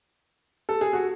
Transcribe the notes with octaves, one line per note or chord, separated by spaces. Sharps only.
A4
G#4
F#4